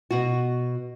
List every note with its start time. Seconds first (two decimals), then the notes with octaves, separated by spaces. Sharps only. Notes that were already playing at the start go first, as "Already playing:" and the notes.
0.11 B2 F#4